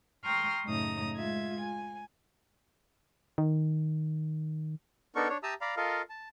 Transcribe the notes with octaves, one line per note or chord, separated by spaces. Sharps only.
G5 A#5 C6 C#6 D#6 F6
F#2 A2 C#3 D#4 A#5 D#6
G#3 F4 E5 G#6
G#5
D#3
B3 D4 D#4 A4 A#4 C#6
D4 C#5
G4 E5 A5 A#5 D#6 E6
D5 F5 A#5 B5
F4 A4 A#4 D#5 F5
A5